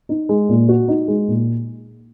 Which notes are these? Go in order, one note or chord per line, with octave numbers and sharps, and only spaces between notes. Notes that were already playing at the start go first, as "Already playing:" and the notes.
D#4
G#3
A#2
F#4
D#4
G#3
A#2